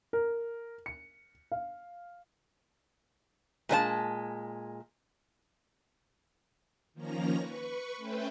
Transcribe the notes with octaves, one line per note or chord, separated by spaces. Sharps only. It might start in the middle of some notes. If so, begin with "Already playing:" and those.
A#4
C#7
F5
A#2 G#3 D4 A5
D#3 F3 A#3 C#4 A#5 A#6
B4 C#6
A3 C#4 B4 C5 E5 G5